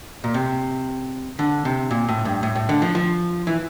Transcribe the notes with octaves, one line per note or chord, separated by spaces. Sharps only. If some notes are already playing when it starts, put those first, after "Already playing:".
A#2
C3
D3
C3
A#2
A2
G2
A2
A2
D3
F3
F3
E3